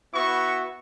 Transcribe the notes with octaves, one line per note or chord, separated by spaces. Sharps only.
B3 E4 F#4 C#6